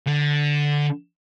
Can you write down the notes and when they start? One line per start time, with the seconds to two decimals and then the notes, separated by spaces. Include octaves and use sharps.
0.07 D3